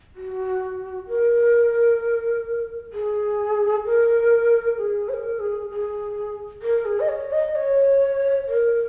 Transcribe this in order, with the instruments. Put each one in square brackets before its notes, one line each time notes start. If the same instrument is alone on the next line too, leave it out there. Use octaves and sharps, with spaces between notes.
[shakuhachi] F#4
A#4
G#4
A#4
G#4
C#5
A#4
G#4
G#4
A#4
G#4
D#5
C#5
D#5
C#5
A#4